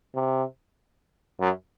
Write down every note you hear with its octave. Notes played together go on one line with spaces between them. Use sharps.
C3
F#2